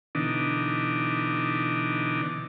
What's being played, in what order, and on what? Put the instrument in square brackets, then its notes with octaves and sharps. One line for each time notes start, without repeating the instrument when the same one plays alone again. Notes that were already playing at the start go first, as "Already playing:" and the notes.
[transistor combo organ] B2 D3 E3 D4 D#4